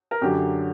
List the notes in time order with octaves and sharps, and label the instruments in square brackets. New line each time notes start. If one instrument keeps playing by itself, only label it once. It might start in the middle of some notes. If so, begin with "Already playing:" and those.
[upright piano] A#4
F#2 D3 F#3 G4